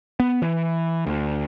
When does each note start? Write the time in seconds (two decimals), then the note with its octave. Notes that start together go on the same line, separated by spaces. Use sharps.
0.20 B3
0.42 E3
1.06 D2